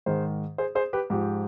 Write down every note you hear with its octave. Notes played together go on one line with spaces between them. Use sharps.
G#2 D#3 G#4 C5
G#4 C5
G#4 C5
G4 B4
G#2 F3 G4